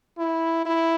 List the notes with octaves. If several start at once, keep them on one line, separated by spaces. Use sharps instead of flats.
E4
E4